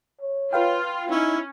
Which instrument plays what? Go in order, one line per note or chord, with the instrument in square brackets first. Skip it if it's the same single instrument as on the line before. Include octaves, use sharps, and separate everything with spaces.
[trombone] C#5
[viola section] F4 [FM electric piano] B4 F5 G5
[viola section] C#4 [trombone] D#4 [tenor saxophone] E4